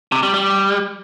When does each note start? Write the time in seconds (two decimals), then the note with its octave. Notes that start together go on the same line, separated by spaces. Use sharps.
0.12 C3
0.23 G3
0.34 G3